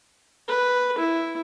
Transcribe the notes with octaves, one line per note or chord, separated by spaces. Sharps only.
B4
E4